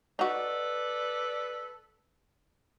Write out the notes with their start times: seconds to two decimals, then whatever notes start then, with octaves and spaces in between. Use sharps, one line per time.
0.19 D#4 F#4 A4 B4 D5